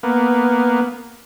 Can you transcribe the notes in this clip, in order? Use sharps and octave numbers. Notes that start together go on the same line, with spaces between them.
A#3 B3